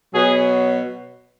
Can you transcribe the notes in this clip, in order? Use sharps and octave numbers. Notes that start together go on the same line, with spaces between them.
B2 F#3 G#4